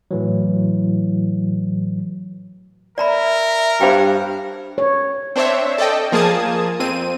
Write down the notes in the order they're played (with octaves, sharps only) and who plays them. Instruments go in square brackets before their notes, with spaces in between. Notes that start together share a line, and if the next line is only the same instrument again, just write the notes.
[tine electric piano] A2 E3 F#3
[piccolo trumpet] A#4 [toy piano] D5 A#5 B5 [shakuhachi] E5
[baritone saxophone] G2 [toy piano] C5 F5 G5
[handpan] C#5
[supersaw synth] C4 D4 C5 C#5 E5
A4 D5 D#5 G5
F3 A#3 G#4 A5 D#6 G#6
F2 C4 D#7